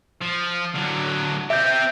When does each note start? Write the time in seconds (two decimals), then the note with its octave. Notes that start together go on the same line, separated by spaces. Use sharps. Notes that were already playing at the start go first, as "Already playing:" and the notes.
0.21 F3
0.75 D3 F#3
1.50 C4 G4 E5 G6